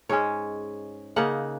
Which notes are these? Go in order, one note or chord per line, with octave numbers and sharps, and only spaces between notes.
G#2 G#3 C#4 C#5
C#3 A#3 D#4 F#5